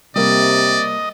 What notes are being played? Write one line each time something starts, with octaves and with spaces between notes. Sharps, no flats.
C3 G3 A#3 D5 D#5